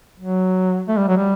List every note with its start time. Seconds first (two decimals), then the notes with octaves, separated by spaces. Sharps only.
0.19 F#3
0.88 A3
0.98 G3
1.08 F#3
1.17 G3